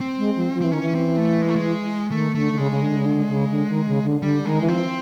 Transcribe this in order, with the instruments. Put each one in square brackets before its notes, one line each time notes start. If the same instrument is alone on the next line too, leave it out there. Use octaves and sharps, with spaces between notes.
[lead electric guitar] C4
[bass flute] G#3
F3
F3
[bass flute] E3 [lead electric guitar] C4
[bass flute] D#3 [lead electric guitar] C#4
[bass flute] E3
[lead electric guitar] C4
A3
G#3
A3
G#3
[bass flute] D#3 [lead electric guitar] A3
[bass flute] D3 [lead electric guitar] A3
[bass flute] D3
[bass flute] C#3 [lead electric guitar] G#3
[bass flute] C#3
D3
C#3
D3
C#3
D3
D#3
C#3
D3
[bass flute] D3 [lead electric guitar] G3
[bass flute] D#3 [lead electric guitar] G#3
[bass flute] E3
[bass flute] F3 [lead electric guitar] C4